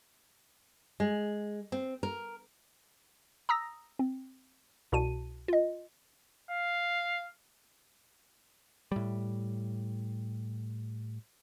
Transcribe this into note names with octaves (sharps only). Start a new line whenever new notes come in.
G#3
C4
A#4
A#5 D#6 E6 A#6
C4
C2 B2 F#4 A5 D#7
F4 D#5
F5
A2 G3